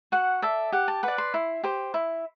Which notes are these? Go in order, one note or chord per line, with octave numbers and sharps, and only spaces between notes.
F#4 F#5
A4 D5 E5
G4 F#5
A5
B4 D5 F#5
C6
E4
G4 C5
E4